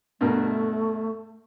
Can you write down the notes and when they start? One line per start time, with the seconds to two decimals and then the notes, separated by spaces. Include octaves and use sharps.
0.21 G2 B2 A3 A#4